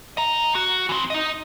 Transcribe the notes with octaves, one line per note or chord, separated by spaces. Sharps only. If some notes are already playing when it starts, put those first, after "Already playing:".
D#5 A#5
F#4
E3 C4
D#4 D#5